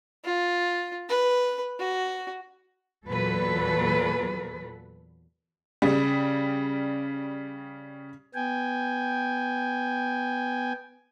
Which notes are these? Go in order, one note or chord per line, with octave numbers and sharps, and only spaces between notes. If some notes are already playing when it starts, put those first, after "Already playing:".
F4
B4
F#4
E2 A#2 F#3 A4 B4
C#3 G3
B3 G5 G#5